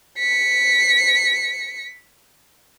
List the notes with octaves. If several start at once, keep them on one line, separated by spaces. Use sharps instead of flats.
B6 C#7